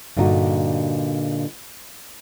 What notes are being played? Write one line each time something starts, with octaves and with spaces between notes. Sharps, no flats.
G2 A#2 D3 D4 D#4 F#4